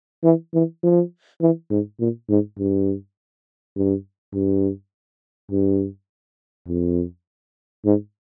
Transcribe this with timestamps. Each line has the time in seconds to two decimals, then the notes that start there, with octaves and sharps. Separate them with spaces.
0.24 E3
0.54 E3
0.83 F3
1.41 E3
1.71 G#2
2.00 A#2
2.30 G#2
2.59 G2
3.76 G2
4.34 G2
5.51 G2
6.68 F2
7.85 G#2